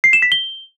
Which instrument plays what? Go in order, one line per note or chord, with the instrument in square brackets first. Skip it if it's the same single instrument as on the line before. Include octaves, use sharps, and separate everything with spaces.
[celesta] C7
E7
B6
G7